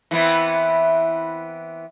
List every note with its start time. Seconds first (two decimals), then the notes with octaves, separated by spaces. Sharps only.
0.11 E3 B3 C4